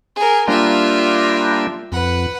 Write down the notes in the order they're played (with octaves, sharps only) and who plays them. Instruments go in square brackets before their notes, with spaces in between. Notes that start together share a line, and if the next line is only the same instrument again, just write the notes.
[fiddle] G#4 A#4
[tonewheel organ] G3 A#3 D4 [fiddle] F4 E5
[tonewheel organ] F2 [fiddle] B4 F#5